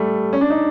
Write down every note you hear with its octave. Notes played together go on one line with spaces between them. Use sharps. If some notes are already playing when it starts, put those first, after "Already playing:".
Already playing: G3 A3
C#4
D4
D#4